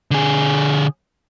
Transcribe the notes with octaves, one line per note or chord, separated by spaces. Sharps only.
D3 G#4